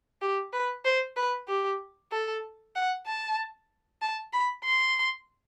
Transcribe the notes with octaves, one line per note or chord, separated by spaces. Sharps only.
G4
B4
C5
B4
G4
A4
F#5
A5
A5
B5
C6